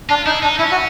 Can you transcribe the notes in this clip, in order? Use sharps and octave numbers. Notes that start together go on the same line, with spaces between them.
D4 F4
D#4 E4
D4 D#4
C#4 E4
F#4